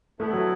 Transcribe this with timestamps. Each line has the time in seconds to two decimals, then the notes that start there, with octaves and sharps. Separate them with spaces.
0.19 D3 A3 B3 E4 A4
0.33 F#3